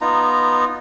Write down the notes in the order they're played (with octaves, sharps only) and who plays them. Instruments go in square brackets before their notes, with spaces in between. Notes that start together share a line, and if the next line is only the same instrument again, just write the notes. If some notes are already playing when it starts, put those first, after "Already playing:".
[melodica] B3 D#4 F4 A#5